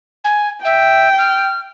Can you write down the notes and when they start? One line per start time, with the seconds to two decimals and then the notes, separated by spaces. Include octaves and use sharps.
0.24 G#5
0.64 E5 G5
1.18 F6